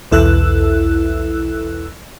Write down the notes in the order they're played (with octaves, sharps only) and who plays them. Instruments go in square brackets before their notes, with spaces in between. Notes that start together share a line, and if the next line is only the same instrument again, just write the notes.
[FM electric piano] B1 E2 E4 A4 E6 F#6